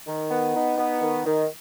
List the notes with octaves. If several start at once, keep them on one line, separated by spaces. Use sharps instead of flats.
D#3
B3
D#4
B3
D#3
D#3